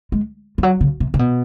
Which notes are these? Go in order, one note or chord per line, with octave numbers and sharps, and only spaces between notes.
G#3
F3
F#3
C#3
C3
C3
B2